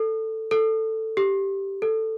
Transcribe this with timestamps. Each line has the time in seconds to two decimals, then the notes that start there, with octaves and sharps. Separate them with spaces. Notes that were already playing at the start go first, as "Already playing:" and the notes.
Already playing: A4
0.51 A4
1.17 G4
1.82 A4